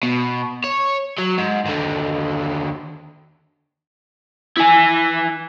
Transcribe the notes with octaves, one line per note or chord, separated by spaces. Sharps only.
B2
C#5
F#3
G#2
D#2 D3
E4 G#5